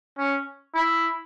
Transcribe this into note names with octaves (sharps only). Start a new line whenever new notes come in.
C#4
E4